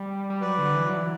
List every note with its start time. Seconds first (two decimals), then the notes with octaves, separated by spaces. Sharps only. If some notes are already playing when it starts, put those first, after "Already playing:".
Already playing: G3
0.30 G3
0.41 F#3 B4 D5
0.58 D3
0.75 E3
0.86 F#3
0.97 E3